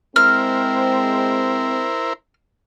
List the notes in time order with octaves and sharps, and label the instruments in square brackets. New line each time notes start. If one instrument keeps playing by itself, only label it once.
[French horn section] G#3 C4 [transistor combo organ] E4 A#4 C5 [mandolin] F6